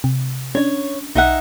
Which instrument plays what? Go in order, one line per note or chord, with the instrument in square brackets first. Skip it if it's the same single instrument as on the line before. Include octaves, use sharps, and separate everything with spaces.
[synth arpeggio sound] C3
[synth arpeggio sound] C#4 D4 [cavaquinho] C#5
[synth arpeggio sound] B1 [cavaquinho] D#4 E5 F#5